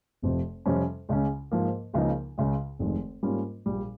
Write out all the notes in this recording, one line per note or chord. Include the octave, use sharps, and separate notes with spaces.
F1 F2 C3 F3 C4
F2 C3 G3 C#4
C#2 C#3 G#3 C#4
G#2 F3 A#3
C#2 C#3 F3 A#3 D#4
C#2 C#3 G#3
F1 F2 D#3 G#3
G#2 G3 A#3 C#4 F4
A#1 A#2 G3